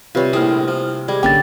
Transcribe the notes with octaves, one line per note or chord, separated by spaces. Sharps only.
C3 G3 F4 B4 C#5
A#1 A2 C4 E4 G#4 F6
F3
G3 G#3 D5 G#6
A1 D3 A#3 C#4 G5 D6 A6